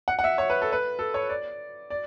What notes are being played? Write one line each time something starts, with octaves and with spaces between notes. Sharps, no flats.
F#5
F#5
E5
C#5
B4
A4
B4
A4
C#5
D5
D5